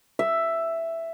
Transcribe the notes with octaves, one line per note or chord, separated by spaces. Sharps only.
E5